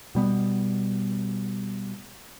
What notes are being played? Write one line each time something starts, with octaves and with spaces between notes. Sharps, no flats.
B2 G3 B3